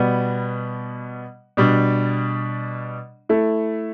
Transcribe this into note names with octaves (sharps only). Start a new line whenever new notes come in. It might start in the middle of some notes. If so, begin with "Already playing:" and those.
Already playing: B2 G3 B3
B2 G3 D4
A3 E4 A4